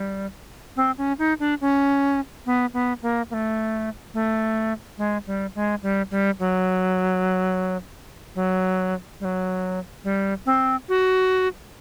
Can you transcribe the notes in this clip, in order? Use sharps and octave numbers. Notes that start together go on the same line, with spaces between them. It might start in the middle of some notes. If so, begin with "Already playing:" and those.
Already playing: G3
C4
C#4
D#4
D4
C#4
B3
B3
A#3
A#3
A3
A3
G#3
G3
G#3
G3
G3
F#3
F#3
G3
F#3
G3
C4
F#4